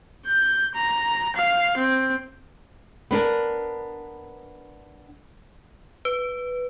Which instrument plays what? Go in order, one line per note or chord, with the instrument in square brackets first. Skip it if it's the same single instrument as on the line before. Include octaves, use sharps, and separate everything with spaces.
[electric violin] G6
A#5
F5
C4
[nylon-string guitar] B3 D4 A#4
[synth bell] B4